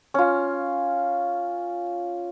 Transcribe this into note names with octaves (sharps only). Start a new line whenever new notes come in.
C#4 F4